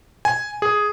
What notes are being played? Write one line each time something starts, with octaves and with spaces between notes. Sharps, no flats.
G#5
G#4